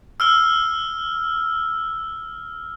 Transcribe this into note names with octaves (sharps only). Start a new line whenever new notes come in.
E6 F6 G7